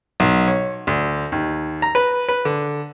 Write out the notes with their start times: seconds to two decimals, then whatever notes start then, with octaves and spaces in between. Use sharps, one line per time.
0.20 B1
0.48 C#5
0.87 D2
1.32 D#2
1.82 A#5
1.95 B4
2.29 B4
2.45 D3